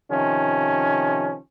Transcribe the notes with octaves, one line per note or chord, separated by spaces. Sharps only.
C3 D#3 F3 C#4